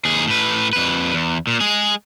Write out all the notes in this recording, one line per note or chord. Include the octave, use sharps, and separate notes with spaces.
D#2 G#4
A2 B4
F2 B4
E2
A#2
G#3 G#4